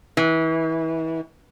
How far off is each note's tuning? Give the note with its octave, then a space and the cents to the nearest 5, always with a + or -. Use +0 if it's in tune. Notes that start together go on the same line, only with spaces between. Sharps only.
E3 -30